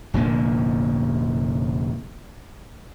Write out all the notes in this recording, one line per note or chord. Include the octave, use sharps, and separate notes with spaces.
F1 A#2 D3 A#3